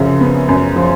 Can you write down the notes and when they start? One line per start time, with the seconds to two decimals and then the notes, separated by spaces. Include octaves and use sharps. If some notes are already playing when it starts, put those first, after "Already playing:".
Already playing: F#2 C#3 F3
0.21 B3
0.49 F#2
0.76 F3